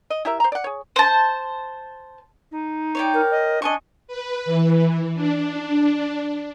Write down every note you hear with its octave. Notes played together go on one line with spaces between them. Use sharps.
D#5
E4 G4 A#4 E5
C5 A#5
D5 F#5
G#4 C#5
C5 A5
D#4
C#5 D5 G5
A#4
D#5
D4 D#5 G#5 C#6
B4
E3
D4